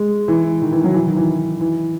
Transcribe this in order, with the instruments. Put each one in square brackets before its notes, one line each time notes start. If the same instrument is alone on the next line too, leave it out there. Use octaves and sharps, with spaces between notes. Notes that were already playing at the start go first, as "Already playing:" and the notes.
Already playing: [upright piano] G#3
E3
D#3
E3
F#3
E3
D#3
E3
E3